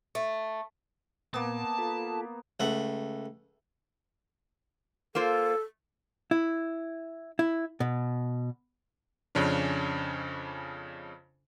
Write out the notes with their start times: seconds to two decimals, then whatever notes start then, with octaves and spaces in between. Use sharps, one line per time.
0.15 A3
1.34 A#2 A#3 B3 A5
1.78 F4 A4 B5
2.60 C#2 A3 F#5
5.15 A#3 F4 A4 C5
6.31 E4
7.39 E4
7.80 B2
9.35 F2 C#3 C#4 D4